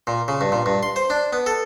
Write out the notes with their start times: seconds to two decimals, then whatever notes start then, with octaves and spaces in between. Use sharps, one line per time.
0.07 A#2
0.28 C#3
0.41 G2
0.52 A#2
0.66 G2
0.83 C6
0.96 C5
1.10 D4
1.33 B3
1.46 A4